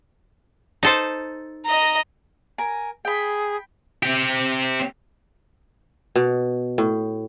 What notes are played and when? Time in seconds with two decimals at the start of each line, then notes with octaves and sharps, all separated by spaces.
0.83 D#4 A4 C5
1.66 D#5 A#5
2.58 A#4 G#5
3.05 G#4 G5 B5
4.03 C4 G4
6.16 B2
6.78 A2